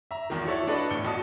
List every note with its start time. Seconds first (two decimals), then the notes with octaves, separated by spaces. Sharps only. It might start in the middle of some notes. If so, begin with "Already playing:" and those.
0.11 E5 A#5
0.30 B1 E2 D#3
0.46 E4 F#4 A4 C#5 D5 E5
0.67 D4 F#4 A4 B4 D5 D#5
0.91 E1 A2 C#7 G7
1.05 B1 F#4 D#5 A5 D#6 C#7